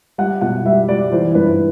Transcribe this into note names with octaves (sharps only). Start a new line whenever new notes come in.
G3 F#5
B2 F#5
G3 E5
G3 D5
E3 C5
G2 B4